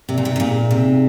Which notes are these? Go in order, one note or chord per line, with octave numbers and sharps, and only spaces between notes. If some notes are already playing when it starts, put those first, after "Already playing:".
C3 D5
A#2
C3 D#4
C3
A#2 G#4
D5
C3 D#4
D#4